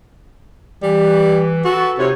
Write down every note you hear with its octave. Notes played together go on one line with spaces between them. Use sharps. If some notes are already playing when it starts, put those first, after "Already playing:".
E3 G3
F#4 A4 B4
C3 D#4 F4 C#5